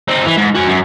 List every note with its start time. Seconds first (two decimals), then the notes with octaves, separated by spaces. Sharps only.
0.08 C4 D#4
0.26 E3
0.37 G#2
0.55 F#4 G#5
0.68 F#2